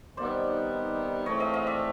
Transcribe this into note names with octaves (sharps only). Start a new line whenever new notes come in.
C3 D#3 G3 B3 D#4 C5 D5
G#2 E3 A3 C4 C#5 D#5
D#5 F5
D#5 F5
D5 E5